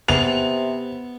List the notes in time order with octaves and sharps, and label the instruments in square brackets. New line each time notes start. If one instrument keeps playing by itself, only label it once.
[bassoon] C3 [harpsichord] B3 [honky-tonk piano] F7